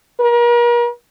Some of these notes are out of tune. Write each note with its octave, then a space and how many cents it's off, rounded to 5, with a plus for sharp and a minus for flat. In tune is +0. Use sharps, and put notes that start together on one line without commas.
A#4 +40